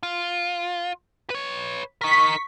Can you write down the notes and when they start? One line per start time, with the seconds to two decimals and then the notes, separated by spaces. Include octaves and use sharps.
0.03 F4
1.30 B4 C#5
2.01 D#4 A#4 C#6 B6